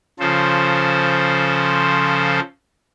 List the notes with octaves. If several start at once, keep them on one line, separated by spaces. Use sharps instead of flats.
C#3 F3 A4 C5